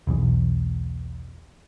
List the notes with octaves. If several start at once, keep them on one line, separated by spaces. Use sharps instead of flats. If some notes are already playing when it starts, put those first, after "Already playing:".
E1 B1 E2